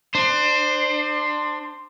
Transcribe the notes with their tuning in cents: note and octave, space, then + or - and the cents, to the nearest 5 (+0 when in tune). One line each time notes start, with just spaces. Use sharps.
D4 +25 C5 +0